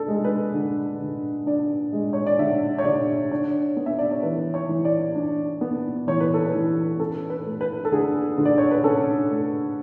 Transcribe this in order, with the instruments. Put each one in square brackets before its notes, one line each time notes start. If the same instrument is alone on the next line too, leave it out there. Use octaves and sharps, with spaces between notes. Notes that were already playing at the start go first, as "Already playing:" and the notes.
Already playing: [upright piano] D4 A4
G#3
B4
D3
D3
D4 D5
G#3
C#5
D5
D3 E5
C#5
D3 D5
D4 C#5
B3
E5
D5
C#5
E3 B4
C#5
E3
D5
D4
B3
E3 C#5
B4
A4
B4
E3
C#4 A4
B4
A3
B4
A4
D3 G#4
D3
D5
C#5
B4
C#4 A4
A3